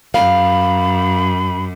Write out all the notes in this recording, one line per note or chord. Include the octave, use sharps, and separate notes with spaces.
F#2 F5 B5